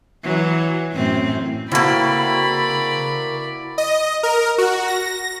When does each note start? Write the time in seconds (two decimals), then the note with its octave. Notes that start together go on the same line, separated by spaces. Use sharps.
0.23 E3 F#3
0.93 F#2 A2 C4
1.72 C#3 A#3 C4 E4 F#4 A4 D5 B5
3.78 D#5
4.23 A#4
4.58 F#4
4.88 A#6